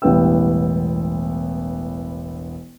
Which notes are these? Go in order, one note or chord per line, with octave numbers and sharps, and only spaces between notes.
E1 A1 G3 B3 G5 E6